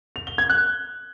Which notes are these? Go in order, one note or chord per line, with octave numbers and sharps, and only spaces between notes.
F7
G7
G#6
F#6